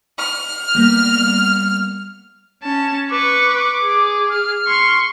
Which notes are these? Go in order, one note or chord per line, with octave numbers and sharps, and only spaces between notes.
F6
G3 A#3 B3
C#4 A5
B4 C#6 D6
G#4
F6
C6 C#6